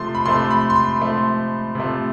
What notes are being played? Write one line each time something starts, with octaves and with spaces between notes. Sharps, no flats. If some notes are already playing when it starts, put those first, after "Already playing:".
Already playing: C3 F3 A3 C6
B5
C3 F3 A3 C6
B5
C6
B5
C3 F3 A3
C3 F3 A3